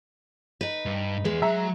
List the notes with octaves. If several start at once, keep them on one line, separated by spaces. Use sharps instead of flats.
D#4 B4
G2
E2 G#3 B4
F#3 E5 A#5